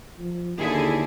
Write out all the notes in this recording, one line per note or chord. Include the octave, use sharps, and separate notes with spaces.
F3
D#2 D3 E4 G#4